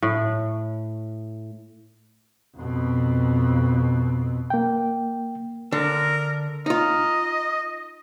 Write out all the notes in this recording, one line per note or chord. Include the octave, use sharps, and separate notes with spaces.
A2
F2 B2
A#3 G5
D3 A#4
D#4 F4 D#5